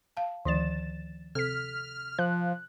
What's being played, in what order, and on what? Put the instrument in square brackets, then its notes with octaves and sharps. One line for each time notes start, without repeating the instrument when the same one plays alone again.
[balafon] F5 A5
[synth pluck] D2 A6 E7 [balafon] D#3 F3 D5
[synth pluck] C3 B6 [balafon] A4 [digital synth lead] F6
[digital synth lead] F3 [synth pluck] F#6